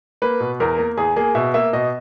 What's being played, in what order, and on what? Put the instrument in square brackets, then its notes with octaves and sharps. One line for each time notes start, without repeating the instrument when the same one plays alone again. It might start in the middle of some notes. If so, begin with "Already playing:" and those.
[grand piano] A#3 B4
B2
E2 A#4
A#3
E2 G#4
A#3 G#4
B2 E5
A#3 E5
B2 D#5